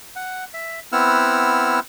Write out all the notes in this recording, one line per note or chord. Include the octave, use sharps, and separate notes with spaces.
F#5
E5
B3 C4 E4 F#5 E6 F6